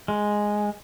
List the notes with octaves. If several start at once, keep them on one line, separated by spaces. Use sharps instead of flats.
G#3